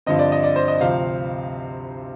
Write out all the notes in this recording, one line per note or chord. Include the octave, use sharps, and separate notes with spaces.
G2 D3 F3 C4 D#5
D5
D#5
D5
C5
D#5
D2 C3 F3 C4 F5